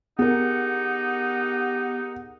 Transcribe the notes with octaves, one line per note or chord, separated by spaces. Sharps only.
B3 D#4 G4 G#4 A#4 F#5